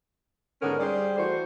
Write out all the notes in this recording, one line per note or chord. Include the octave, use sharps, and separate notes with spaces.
G#2 D3 B3 C#4 A#4
G3 G#4 C5 D5
E3 A3 F#4 C5